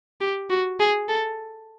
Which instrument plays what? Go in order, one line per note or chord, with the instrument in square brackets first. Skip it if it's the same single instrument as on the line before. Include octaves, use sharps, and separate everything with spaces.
[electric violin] G4
F#4
G#4
A4